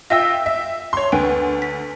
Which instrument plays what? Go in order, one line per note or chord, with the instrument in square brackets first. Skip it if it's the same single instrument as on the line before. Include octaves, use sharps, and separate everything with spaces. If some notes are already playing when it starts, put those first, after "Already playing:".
[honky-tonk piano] F4 E5 G5 [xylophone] E6 A#6
[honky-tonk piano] E5
C#5 C6
[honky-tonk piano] D2 [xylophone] B4 G5 G#5
[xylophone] B6